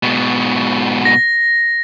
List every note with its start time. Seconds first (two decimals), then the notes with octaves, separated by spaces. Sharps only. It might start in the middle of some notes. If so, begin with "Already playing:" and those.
0.03 G#2 B2
1.05 A#6